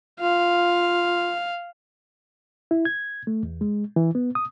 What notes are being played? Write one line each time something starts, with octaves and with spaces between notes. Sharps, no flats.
F4 F5
E4
G#6
A3
E2
G#3
E3
B3
D#6